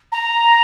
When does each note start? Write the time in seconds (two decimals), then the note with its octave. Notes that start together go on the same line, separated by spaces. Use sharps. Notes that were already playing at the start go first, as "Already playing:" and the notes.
0.12 A#5